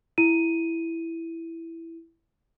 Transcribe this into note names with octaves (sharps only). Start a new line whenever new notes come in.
E4 D#7